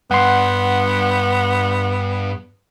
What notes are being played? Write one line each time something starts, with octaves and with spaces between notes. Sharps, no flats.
G2 B3 F#5 C6